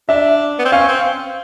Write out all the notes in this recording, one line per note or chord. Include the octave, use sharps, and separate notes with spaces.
D4 E5
B3
C4
C#4 F5
C4